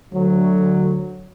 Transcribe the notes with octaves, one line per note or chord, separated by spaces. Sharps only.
D2 D3 F#3